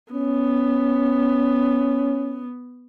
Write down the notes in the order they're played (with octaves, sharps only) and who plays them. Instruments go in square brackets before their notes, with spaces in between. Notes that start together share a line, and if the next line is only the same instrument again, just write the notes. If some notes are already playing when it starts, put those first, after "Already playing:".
[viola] B3 [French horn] C#4